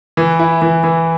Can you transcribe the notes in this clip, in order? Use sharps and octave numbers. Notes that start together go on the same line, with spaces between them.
E3
E4
E3
E3